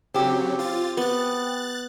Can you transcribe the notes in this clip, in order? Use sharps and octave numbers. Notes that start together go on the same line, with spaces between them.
C#3 F#3 C4 G4
F4 A6
B3 F#6 A6